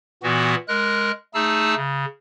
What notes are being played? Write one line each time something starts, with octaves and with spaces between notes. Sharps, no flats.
A#2 E3 B3 F#4
G#3 A#4 F#6
A3 D#4 G#4 A5 E6
C#3